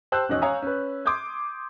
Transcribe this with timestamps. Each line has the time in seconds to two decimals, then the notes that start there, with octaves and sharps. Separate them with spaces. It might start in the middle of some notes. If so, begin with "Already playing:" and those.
0.12 G4 C5 A5 E6 F#6 G6
0.29 E1 D#3 C#4 D#5 F#6
0.42 C#5 F5 G#5 A#5 D#6
0.62 C#4 B4
1.05 C6 D6 D#6 G6 G#6